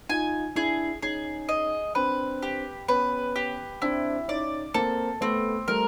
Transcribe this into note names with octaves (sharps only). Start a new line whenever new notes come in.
D#4 F4 G#5
D4 E4 G#4
C#4 D#4 G#4
D#5
C4 D4 B4
G4
B3 C#4 B4
G4
C4 D4 E4
C#4 D#4 D5
A#3 C4 A4
A3 B3 C4
G3 A3 A#4